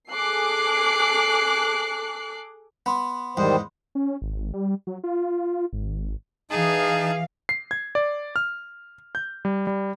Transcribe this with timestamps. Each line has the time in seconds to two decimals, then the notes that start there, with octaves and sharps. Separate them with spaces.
0.11 G#4 A4 D6 F#6 C7
2.86 B3 B5 C6
3.37 E2 G#2 D#3 G3 C5
3.95 C#4
4.21 G#1
4.54 G3
4.87 F#3
5.04 F4
5.72 G#1
6.50 E3 D#4 G#4 F5 A5
7.49 C7
7.71 G#6
7.95 D5
8.36 F6
9.15 G6
9.45 G3
9.67 G3